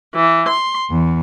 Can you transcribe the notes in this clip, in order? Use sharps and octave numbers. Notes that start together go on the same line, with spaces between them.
E3
C6
E2